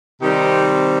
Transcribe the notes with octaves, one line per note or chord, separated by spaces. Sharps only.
C3 D#3 G3 C4 D#4 G4